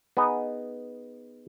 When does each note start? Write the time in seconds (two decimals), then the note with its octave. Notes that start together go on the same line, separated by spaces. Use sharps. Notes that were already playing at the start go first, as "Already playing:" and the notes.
0.17 B3 D#4 G#4 D#5